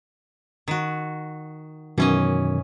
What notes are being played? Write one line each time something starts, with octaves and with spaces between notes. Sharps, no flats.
D#3 F#4
F#2 B2 D#3 E3 C#4 D#5